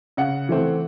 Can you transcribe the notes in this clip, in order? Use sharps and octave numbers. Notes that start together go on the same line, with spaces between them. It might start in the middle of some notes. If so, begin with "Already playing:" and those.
C#3 F#5
E3 A3 C4